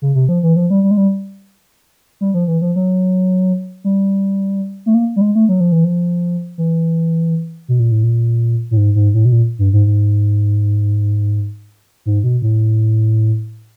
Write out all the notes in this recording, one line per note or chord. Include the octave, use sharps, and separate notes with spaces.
C#3
C3
F3
E3
F3
G3
G3
G#3
G3
G3
F3
E3
F3
F#3
G3
A3
A#3
G3
G#3
A3
F#3
F3
E3
F3
E3
B2
A#2
A2
A#2
A2
G#2
G#2
A2
B2
A#2
G2
G#2
G#2
G#2
B2
A2